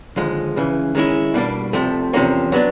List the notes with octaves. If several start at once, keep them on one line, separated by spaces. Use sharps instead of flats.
D#2 D3 F3 G#3
C#2 C#3 E3
D#3 G#3 C#4 E4
B2 G3 A#3 D4
C2 C3 F3 A3
E2 C3 F3 A#3 C#4
F#3 B3 D4